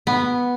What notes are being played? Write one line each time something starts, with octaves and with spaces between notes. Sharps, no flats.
B3